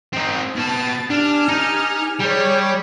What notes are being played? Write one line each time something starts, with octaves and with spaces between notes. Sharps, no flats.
C4 D#4
B2 A5 A6
D4 G4 G#5 F6
D#4
G3 G#4 C#5